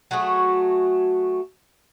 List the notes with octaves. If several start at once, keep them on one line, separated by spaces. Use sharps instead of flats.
F#3 A3 F#4 G#4